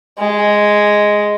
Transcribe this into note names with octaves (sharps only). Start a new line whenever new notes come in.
G#3